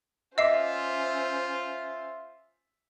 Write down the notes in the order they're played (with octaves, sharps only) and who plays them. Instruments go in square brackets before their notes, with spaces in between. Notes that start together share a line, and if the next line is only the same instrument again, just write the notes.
[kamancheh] C#4 C5 [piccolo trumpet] F4 [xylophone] D#5 C7 [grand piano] E5 D6